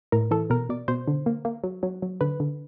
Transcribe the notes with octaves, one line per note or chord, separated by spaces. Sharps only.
A2 A#4
E3 A4
B2 A#4
B2 D5
B2 C5
D3
A#3
A#3
F#3
F#3
F#3
D3 B4
D3